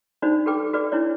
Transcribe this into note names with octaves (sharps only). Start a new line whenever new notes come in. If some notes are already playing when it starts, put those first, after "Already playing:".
D4 D#4 F#4 C5 D5
F#4 G4 A4 B4 G5 D6
F#4 B4 D5 D6
D4 E4 C#5 D5